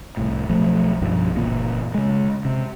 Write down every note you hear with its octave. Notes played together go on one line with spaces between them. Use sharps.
C2 A2
B1 F3 A3
B1 G2 F3
F#1 A#2 E3 A#3
C#3 G#3
C3